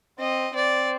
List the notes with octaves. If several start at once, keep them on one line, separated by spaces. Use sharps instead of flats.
C4 D#5
C4 D5